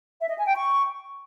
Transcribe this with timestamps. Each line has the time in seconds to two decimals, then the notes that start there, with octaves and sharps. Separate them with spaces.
0.20 E5
0.29 D#5
0.38 G#5
0.47 G5
0.55 C#6